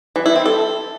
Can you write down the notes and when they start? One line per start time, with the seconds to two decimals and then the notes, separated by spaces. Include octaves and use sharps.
0.16 E3
0.26 E4
0.36 C4
0.46 A4